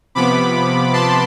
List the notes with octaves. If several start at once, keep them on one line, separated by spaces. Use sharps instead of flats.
C3 F3 B3 B5 D6
A5 C6